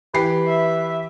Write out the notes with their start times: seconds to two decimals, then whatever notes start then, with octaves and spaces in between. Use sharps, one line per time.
0.14 E3 G4 B4 C7
0.48 E5